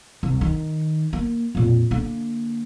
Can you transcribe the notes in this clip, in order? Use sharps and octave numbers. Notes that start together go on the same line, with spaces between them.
C2
D#3
A#3
F2 A#2
D3 A#3